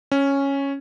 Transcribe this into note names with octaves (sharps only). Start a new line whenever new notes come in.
C#4